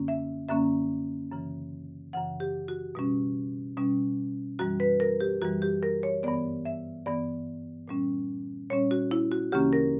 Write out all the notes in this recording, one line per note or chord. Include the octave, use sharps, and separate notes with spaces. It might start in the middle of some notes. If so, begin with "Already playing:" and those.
Already playing: F#2 D3 A#3 C#4
E5
F#2 D3 A#3 C#4 E5
F#2 C#3 E3
F#2 C#3 E3 F#5
G4
F#4
B2 G3 C#4
B2 G3 C#4
F#2 E3 G3 F#4
B4
A#4
G4
F#2 E3 G3 F#4
G4
A#4
C#5
G2 E3 B3 D5
E5
G2 E3 B3 D5
A#2 G3 C#4
A#2 G3 C#4 C#5
F#4
E4
F#4
D2 C#3 E3 A#3 C#4 G4
A#4